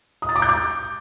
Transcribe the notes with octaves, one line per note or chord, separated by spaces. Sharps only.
D#6
A6
D6
G6
D6